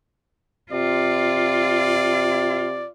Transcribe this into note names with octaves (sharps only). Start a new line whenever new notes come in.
C3 F4 D5